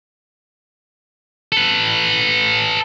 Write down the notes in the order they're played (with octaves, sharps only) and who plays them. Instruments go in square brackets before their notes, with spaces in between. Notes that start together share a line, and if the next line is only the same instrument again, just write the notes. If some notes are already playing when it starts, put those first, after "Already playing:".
[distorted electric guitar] A4 B4